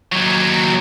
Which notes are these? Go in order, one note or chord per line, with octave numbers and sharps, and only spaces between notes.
D#2 F#3